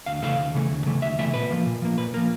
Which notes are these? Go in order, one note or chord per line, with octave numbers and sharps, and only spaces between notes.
D2 F5
C#3 E3 A3 F5
D2
C#3 E3 A3
D2
C#3 E3 A3
D2 E5
C#3 E3 A3 E5
A#2 B4
F3 A#3
A#2
F3 A#3
A#2 B4
F3 A#3 A#4